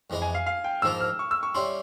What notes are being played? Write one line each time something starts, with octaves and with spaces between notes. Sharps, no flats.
F2 E3 G#3 E4
G#5
F5
F5
G5
G#2 F3 A#3 F4 E6
F6
C#6
E6
C#6
G3 C#4 E4 C6